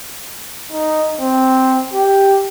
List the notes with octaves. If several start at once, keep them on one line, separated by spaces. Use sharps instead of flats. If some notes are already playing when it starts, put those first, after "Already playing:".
D#4
C4
G4